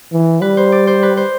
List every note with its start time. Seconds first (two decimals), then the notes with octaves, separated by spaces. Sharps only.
0.12 E3
0.41 G3 B4
0.57 C5
0.72 D5
0.87 C5
1.03 B4
1.17 C5